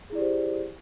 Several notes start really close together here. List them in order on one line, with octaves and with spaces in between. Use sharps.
G#4 E4 D5 G4 C5